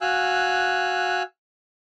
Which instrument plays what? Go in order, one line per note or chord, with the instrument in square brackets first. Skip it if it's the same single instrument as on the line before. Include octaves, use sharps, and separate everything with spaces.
[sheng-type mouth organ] F#4 F5 G#5 E6 F#6